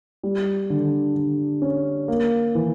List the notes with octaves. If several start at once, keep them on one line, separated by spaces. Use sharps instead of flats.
G3
D3
D3
C#4
A#3
E3